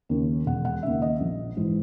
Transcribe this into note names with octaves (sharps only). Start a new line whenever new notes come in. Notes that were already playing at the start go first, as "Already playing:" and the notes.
D#2 C#3
E1 F#5
F#5
D#2 C#3 E5
D#5
A#1
G#2 E3 G#3